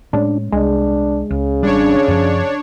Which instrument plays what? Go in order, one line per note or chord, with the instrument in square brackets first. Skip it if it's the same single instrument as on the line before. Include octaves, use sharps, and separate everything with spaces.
[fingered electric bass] A2 G#3 C#4 [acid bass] D4
[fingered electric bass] C2 [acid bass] G#3 [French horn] D4
[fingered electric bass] C#2 [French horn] C#3
[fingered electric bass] G#1 G3 [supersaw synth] D4 C#5
[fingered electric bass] F#2 F3